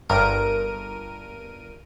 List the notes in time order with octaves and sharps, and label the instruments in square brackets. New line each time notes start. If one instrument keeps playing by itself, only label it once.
[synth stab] G1 G2 A#4 D7 D#7